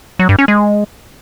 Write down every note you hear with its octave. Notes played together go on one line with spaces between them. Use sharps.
F#3
G2
C#4
G#3